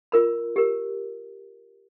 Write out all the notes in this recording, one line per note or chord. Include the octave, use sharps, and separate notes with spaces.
F4 A#4 B5
G4 A#4